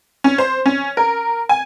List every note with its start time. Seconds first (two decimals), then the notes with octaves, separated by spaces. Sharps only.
0.24 C#4
0.38 C5
0.66 C#4
0.97 A#4
1.49 G#5